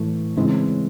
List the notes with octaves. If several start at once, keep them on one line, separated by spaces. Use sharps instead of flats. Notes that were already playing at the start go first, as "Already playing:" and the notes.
Already playing: A2 E3 A3
C#3 E3 G#3 C4 E4